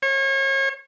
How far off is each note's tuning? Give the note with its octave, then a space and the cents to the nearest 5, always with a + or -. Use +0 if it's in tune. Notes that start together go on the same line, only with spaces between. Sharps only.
C#5 -35